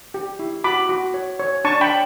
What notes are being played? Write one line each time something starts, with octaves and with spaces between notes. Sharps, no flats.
G4
E4
F#4 B5 D6
F#4
C#5
C#5
D4 A5 C#6
G5 B5
C#5